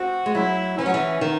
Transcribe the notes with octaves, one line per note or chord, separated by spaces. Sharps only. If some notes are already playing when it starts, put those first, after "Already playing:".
Already playing: C4 F#4
G#3
F#3 E4
E3 C#4
F#3
E3
D#3